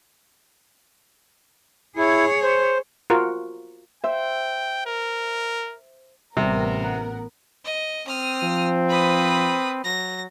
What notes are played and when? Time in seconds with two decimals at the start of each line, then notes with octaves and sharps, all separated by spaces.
1.97 E4 G#4 C#5
2.43 C5
3.10 F4 F#4 A#4
4.04 C5 E5 G5
4.86 A#4
6.37 A1 C3 G3 B3 A#4 A#6
6.84 F#5
7.65 D#5
8.07 C4 D#6 F6
8.43 F3
8.88 B4 B5 D#6
9.84 F#3 A#6